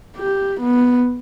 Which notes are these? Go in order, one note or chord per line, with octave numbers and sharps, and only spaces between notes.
G4
B3